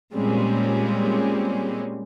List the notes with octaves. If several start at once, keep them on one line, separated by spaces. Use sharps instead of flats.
A#2 G3 G#3 C4 C#4